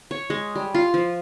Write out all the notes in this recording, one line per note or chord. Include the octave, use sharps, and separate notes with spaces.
C#5
G#3
G3
F4
F3